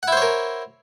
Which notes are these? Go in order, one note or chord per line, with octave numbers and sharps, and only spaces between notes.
E4 A#4 C5 C#5 F#5